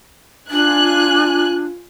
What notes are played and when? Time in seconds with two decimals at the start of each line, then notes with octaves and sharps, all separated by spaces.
0.51 D4 F4 G#5 F#6